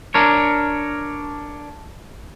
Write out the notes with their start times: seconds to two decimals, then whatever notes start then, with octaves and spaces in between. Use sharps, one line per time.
0.14 D4 A#4 C#5